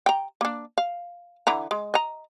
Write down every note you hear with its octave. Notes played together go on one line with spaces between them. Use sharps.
G5 A#5
A#3 D4
F5
D3 E3 A#5
G#3
D#5 A#5